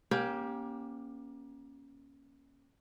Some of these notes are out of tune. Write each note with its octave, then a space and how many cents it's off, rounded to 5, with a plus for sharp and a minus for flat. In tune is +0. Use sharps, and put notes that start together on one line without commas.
A#3 +30 C#4 +0 G4 +0